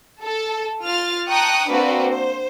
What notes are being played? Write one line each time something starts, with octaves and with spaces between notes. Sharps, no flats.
A4
F4 F6 A6
G5 A5 A#5 C#6 D#6 F#6
A#3 C4 D4 F#4 B4 D5
C5